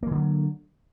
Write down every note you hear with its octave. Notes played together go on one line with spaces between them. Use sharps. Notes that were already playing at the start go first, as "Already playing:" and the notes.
D3 E3 F#3 A#3